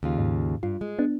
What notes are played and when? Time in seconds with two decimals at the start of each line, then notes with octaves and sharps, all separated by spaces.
0.03 D#2 C#3 F4
0.18 G#2
0.63 G2 F4
0.81 G#3
0.99 B3 D4